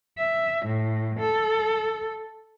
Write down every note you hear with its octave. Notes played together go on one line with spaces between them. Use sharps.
E5
A2
A4